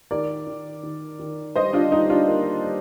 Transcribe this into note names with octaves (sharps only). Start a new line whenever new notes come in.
D#3 A#4 D5
D#3
D#3
D#3
G3 C5 D#5
D4 F4
G3 D#4
D4 F4
A#3
G3